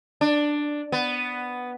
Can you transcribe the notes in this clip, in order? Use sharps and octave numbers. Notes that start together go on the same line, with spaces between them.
D4
B3